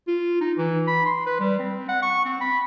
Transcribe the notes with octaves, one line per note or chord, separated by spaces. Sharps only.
F4
D#4
E3
B5
C6
B4
G3
C4
F#5
C#6
C4
B5